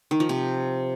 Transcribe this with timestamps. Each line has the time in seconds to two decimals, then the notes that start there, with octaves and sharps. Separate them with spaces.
0.11 D#3
0.20 F3
0.29 C3